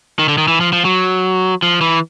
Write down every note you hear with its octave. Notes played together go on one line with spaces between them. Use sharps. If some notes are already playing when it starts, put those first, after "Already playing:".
D#3
D3
D#3
E3
F3
F3
F#3
F3
E3